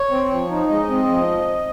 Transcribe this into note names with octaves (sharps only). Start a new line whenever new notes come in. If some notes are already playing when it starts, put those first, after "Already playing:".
Already playing: C#5
C4
F3
D#4
G#3 D#5
C4
F3